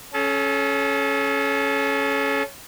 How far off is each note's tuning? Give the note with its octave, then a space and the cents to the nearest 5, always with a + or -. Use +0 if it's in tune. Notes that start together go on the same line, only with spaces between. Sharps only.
C#4 +0 A4 -35